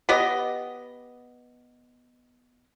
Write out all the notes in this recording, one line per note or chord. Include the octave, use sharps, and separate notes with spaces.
B3 G4 D#5